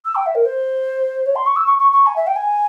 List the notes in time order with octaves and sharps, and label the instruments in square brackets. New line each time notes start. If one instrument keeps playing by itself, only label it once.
[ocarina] E6
G5
E5
A#4
C5
C#5
C6
C#6
E6
C#6
C#6
C#6
G#5
E5
G5
G#5